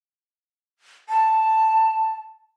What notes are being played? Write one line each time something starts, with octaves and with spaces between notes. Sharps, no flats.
A5